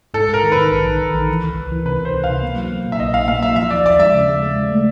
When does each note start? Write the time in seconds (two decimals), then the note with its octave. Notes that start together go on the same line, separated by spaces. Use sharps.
0.14 G#2 A4
0.29 G#2 A#4
0.43 D#3
0.52 B4
0.57 D#3
0.71 A#1
0.86 D#3
1.00 A#1
1.15 D#3
1.29 E3
1.43 C#2
1.56 C#2
1.72 E3
1.85 C3 B4
1.99 C#2
2.05 C5
2.14 C3
2.24 F5
2.29 C3
2.43 A#3
2.56 F#3
2.72 A#3
2.86 A#2
2.92 E5
3.00 A#1 D#5
3.13 A#2 F5
3.28 A#3 F5
3.42 F#3 E5
3.56 F3 E5
3.71 D#2 D5
3.85 D#2 D5
3.99 G#3 E5
4.14 C#3
4.28 G#3
4.42 G#3
4.56 C#3
4.71 A3